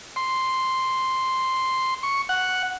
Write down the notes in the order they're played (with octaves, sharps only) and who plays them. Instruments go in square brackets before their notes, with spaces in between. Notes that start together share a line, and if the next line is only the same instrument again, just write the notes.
[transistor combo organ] C6
C#6
F#5